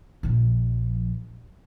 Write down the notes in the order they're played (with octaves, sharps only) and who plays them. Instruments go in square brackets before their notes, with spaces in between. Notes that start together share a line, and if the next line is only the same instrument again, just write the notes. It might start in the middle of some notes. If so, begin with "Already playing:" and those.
[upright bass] A#1 F3